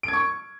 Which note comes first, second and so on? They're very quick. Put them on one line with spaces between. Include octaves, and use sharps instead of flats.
D7 G#6 C#6